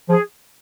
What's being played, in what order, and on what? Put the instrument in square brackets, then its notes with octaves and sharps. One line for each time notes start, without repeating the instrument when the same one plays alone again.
[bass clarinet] F3 [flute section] G#4